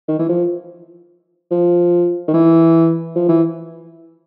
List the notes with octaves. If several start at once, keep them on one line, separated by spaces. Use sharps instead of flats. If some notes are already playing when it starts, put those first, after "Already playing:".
D#3
E3
F3
F3
D#3
E3
F3
E3